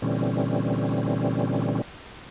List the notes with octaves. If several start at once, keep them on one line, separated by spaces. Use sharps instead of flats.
A#2 D3 E3 G3 C4 C#4